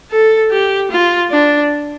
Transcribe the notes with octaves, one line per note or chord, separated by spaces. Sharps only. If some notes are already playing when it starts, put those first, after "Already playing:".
A4
G4
F4
D4